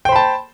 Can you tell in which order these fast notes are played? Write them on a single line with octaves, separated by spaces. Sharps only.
G5 C5 B5 A5